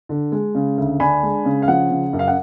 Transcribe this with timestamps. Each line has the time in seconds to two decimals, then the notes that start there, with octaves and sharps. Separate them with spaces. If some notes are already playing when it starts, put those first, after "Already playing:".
0.09 D3
0.32 G#3
0.55 C#3
0.78 D2
1.00 D4 G#5 B5
1.23 G#3
1.45 C#3
1.62 F5
1.68 F3 F#5
1.91 C#3
2.13 F#2
2.19 F5
2.28 F#5